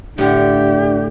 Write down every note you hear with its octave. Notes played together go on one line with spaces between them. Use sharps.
A2 D3 D4 G4